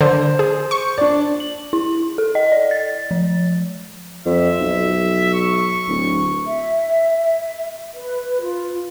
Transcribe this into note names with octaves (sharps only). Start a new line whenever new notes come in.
D3 C5
G#4
C#6
D4 D5
F#7
E4
A4
D#5
D5
A6
F3
F2 E5
B1
C#6
D1
E5
B4
F4